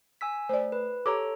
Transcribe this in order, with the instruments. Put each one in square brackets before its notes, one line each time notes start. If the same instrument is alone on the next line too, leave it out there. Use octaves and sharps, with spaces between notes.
[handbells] G#5 E6 B6
[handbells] A3 [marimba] C5 D5
[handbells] B4
[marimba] G4 D6 [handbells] A4 C#5 A#5